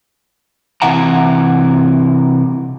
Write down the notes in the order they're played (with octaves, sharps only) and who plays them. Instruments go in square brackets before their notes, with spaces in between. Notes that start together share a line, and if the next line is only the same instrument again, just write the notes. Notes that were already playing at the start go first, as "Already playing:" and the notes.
[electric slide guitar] C3 E3 E5 F#5 A#5